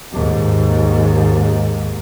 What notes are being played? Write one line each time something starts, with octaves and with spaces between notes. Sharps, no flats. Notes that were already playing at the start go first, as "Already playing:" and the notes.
D#2 G#2